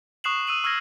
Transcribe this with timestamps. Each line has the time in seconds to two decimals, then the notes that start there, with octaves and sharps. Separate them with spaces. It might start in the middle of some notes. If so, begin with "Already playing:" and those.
0.24 C#6 D#6 F#6 C7 E7 F#7
0.47 D#6 E6 D#7 F#7
0.64 C#6 E6 F6 G#6 A#6 D#7